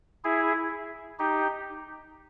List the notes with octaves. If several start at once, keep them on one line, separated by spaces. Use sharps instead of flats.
E4 G#4
D#4 G4